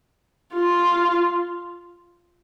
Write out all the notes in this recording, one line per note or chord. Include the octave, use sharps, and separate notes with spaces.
F4